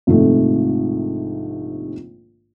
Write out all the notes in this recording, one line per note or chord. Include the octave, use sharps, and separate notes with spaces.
A#1 G#2 C3 D#3 A3